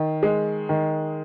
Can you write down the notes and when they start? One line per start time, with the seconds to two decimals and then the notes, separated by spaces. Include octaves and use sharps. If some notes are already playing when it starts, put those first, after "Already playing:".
Already playing: D#3
0.23 G#3
0.69 D#3